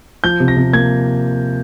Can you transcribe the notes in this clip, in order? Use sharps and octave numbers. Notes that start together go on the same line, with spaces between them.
F3 G6
C3
A#6
C3
A#3 G#6